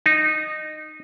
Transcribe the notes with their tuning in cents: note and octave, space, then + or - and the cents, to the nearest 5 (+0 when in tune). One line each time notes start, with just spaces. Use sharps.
D#4 -15